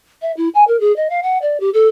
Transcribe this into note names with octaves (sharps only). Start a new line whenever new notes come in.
E5
E4
G#5
A#4
G#4
D#5
F5
F#5
D5
G4
A4